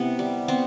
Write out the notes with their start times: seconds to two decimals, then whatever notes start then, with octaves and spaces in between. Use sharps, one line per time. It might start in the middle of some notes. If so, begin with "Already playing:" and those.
Already playing: C3 B3 E4
0.19 G3
0.48 B3 C4